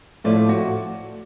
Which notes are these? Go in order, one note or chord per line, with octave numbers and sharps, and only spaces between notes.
A2 F3 A3 D5
F#4